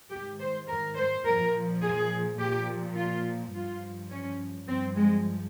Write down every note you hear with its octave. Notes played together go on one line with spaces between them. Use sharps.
G#2 D#3 G4
C5
A#4
C5
A#2 F3 A#4
G#4
A#2 F3 G4
F4
G2 F3 F4
C#4
G2 F3 C4
G#3